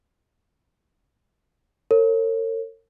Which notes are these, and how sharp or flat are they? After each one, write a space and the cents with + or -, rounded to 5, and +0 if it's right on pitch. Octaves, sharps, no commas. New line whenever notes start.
A#4 -45 C#5 -35